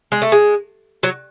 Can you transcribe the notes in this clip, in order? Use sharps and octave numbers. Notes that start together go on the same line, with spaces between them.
G#3
A3
G#3
F#3